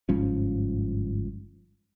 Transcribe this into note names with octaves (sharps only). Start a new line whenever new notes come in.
G1 G#2 F3 C#4